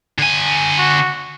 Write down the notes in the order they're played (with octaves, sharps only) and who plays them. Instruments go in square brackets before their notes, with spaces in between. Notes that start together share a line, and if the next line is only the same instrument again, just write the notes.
[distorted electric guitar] D3 G#5
[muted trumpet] F#4